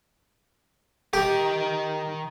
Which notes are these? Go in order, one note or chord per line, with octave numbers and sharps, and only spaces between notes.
D#3 G4 G5